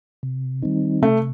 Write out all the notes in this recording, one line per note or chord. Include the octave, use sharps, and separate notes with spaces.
C3
D#3 G3 C4 D#4
C3 A3